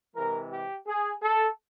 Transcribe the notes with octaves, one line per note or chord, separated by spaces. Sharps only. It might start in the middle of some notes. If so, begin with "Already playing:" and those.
C3 E3 G#3 A#4
G4
G#4
A4